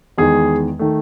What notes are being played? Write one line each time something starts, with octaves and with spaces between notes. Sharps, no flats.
E2 D#3 G#3 G#4
D#3 A3